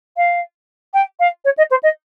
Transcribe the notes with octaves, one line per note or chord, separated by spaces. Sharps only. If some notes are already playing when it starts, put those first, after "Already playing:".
F5
G5
F5
C#5
D#5
C5
D#5